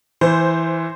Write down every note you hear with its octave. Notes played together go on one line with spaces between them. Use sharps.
E3 C5